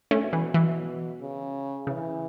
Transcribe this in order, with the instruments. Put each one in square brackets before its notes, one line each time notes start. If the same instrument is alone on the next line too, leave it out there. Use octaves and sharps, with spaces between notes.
[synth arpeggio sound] A3 C#4
[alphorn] B2
[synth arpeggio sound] E3
[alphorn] B2 [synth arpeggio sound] E3
[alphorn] C#3
[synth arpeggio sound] C#3 [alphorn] E3